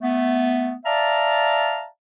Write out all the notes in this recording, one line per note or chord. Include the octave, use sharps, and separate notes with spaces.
A3 B3
D5 E5 F5 A5 A#5